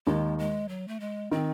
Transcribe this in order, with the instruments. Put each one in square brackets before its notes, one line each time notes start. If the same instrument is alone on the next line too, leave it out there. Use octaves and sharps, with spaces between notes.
[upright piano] D#2 D#3 [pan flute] G#3
[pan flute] G#3
F#3
A3
G#3
[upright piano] D#3 [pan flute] C4